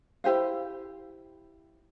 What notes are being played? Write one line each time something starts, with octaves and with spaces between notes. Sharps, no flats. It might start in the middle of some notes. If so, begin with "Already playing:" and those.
E4 G4 C5 F5